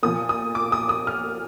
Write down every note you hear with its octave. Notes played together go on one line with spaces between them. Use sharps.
A#2 F3 A#3 D#6
D#6
D6
D#6
D#6
F6